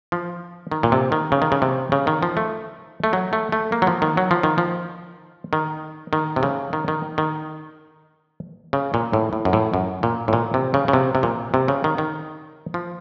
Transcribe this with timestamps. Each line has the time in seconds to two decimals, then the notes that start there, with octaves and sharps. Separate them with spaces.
0.12 F3
0.72 D#3
0.83 A#2
0.92 C3
1.12 D#3
1.32 C#3
1.42 D#3
1.52 C#3
1.62 C3
1.92 C#3
2.07 D#3
2.23 F3
2.37 A3
3.04 A3
3.13 F#3
3.33 A3
3.52 A3
3.72 A#3
3.82 F#3
3.87 F3
4.02 D#3
4.17 F#3
4.31 F3
4.43 D#3
4.58 F3
5.53 D#3
6.13 D#3
6.36 C3
6.43 C#3
6.73 D#3
6.88 D#3
7.18 D#3
8.73 C#3
8.94 A#2
9.13 A2
9.33 A2
9.45 F#2
9.53 A2
9.74 F#2
10.03 A#2
10.28 A2
10.33 A#2
10.54 C3
10.74 C#3
10.88 C#3
10.93 C3
11.15 C3
11.23 A#2
11.54 C3
11.68 C#3
11.84 D#3
11.98 D#3
12.74 F3